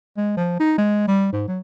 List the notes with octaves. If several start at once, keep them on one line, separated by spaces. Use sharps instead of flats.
G#3
F3
D#4
G#3
G3
G#2
F#3